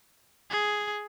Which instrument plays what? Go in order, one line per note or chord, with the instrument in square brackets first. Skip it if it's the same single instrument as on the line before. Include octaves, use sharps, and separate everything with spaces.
[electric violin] G#4